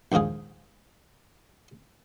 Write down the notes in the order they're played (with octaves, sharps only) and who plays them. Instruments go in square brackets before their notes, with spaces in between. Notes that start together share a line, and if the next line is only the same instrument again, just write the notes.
[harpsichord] A#1 D#2 G#2 F4 G#4